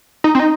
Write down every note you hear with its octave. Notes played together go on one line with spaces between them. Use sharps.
D#4
C4
D#4